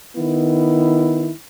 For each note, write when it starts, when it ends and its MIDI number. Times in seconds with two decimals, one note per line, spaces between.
0.15 1.30 51
0.15 1.30 59
0.15 1.30 64